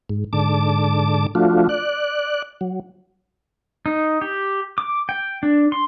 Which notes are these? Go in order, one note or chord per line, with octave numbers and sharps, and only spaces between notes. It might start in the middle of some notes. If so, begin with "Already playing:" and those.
G#2
G#2 D3 A5 D6
F3 A3 D4 F4 F#4
D5 F#6
F#3
D#4
G4
D6
G5
D4
C6